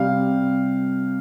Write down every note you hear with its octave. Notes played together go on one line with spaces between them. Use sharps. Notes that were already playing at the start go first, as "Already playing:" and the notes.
Already playing: C3 G3 F5